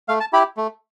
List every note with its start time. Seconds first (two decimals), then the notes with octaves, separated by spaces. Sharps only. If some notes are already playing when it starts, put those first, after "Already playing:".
0.08 A3 F5
0.20 A5
0.33 E4 G4 B5
0.57 A3